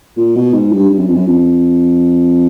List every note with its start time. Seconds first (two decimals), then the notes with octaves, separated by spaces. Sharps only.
0.17 A#2
0.35 B2
0.53 G#2
0.72 G2
0.90 G2
0.98 F#2
1.07 F2
1.15 F#2
1.27 F2